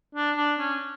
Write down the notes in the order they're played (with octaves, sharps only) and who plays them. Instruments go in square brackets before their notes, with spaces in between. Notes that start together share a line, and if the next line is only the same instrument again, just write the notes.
[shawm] D4
D4
C#4